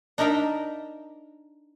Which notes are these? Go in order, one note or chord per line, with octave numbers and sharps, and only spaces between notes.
D4 D#4 A#4 D#5 E5